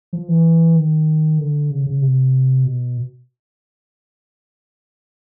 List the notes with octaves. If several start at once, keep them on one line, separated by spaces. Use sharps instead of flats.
F3
E3
D#3
D3
C#3
C#3
C3
B2